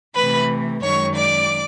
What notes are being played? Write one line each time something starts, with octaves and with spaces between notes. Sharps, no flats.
C3 E3 A3 B4 B5
F#2 D#3 G#3 C#5 C#6
D5 D6